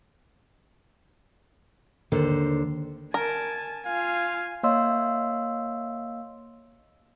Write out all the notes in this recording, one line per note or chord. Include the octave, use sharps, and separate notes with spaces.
D#2 D3 C5
A#4 G#5 A5
F4 F5 G#5
A#3 C#5 D#5 F5 C6 E6